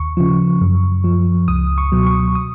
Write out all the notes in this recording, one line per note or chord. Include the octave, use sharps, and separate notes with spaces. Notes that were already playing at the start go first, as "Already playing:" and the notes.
Already playing: D#2 C#6
C#3 F3
F#2
F3
C#2 D#6
C#6
B2 F#3
C#6
D#6